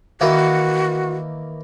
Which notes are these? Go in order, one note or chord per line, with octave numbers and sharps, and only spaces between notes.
D#3 E3 A#3 F#4